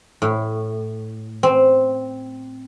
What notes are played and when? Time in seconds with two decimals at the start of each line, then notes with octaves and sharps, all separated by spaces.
0.22 A2
1.43 C4